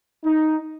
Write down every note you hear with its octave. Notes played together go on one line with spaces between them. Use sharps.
D#4